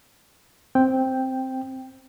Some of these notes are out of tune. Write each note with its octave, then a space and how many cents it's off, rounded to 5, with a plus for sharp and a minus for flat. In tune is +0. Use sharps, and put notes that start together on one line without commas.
C4 +0 G5 +0